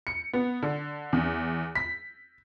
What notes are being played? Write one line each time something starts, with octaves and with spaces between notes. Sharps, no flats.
C#7
B3
D3
E2
B6